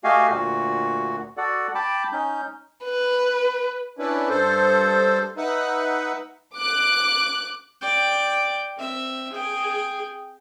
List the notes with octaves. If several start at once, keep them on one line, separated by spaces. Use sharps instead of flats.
A3 F#4 G4 D#5 F5 G#5
D2 A#2 F#4
F#4 A4 D5 F#5
G5 A5 B5 D6
C#4 D#4 G6
B4
C#4 D4 E4 B4
G2 A4 C5
D#4 B4 E5 F#5
D6 F#6
D5 G5
C4 E5
G#4 G5